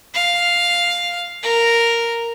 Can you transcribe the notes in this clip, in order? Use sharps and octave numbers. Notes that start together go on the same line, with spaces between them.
F5
A#4